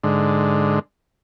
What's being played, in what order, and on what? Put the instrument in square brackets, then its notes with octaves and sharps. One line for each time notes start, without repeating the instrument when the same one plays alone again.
[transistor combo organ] G#2 D3